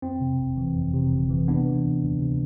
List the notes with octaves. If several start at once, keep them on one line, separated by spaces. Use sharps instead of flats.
F2 C4
C3
G1
E3
F2
C3
G1
E3
C3 B3 D4
E3
D2
D2
C3